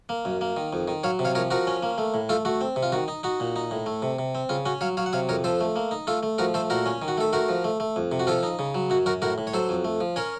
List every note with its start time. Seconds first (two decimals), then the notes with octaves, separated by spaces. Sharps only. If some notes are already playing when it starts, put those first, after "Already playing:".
0.09 A#3
0.25 F#2
0.41 A#3
0.57 D#3
0.73 F2
0.88 D#3
1.04 F#3 C#5 F5
1.19 C3
1.25 C#5 F5
1.35 F3 A#4 C#5
1.50 F3 F#4 A#4
1.67 C#4
1.83 A#3
1.98 A3
2.14 A2
2.29 A3 F4 A4
2.45 A3 F#4
2.61 C4
2.76 C3
2.83 F4
2.92 D#3 F#4
3.08 D#4
3.23 D#4 F#4
3.40 A#2
3.56 D#4
3.71 A2
3.86 A3
4.02 C3
4.19 C3
4.35 C4
4.49 C#3 F4
4.66 C#4 F#4
4.81 F#3 C#5 F5
4.97 F#3 C#5 F5
5.06 F#5
5.13 C3 C#5 F5
5.29 F2 A#4 C#5
5.44 F3 A4 C5
5.61 A3
5.76 A#3
5.91 D#4
6.07 A3 F4 A4
6.23 A3
6.38 F3 F#4 A#4
6.54 A3 A4 C5
6.70 A#2 F#4 A#4
6.86 C#4
7.02 D#3
7.08 F#4
7.18 A3 A4
7.33 A3 F#4 A#4
7.49 F3
7.64 A3
7.80 A3
7.96 F2
8.12 C3
8.20 F#4
8.27 F3 F4 A4
8.43 D#4
8.59 C#3
8.75 F#3
8.90 F#2 F#4
9.06 F#2 F#4 A#4
9.22 A2 F#4 A#4
9.38 A2
9.47 C#5
9.53 F#3 A4 C5
9.69 F2
9.84 A3
10.01 F3
10.16 C#4 A#4 C#5